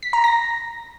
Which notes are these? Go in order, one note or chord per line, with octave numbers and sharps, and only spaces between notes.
B6
A#5
A#6